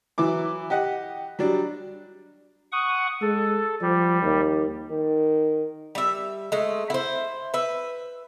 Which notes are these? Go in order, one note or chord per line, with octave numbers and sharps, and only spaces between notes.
E3 F#3 E4 D6
G4 D#5 F#5
F#3 G3 D4
F#5 C#6 D#6
G#3 A4
F3 G3
D#2
D#3
G3 E5
G#3 A3
E4 C5
B4 E5